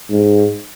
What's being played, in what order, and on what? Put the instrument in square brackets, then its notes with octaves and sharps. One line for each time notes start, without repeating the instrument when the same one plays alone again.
[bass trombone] G#2